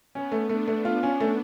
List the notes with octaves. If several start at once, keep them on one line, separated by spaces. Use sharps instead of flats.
B3 C#4
A3
A3 D4
A3
F4
C#4
A3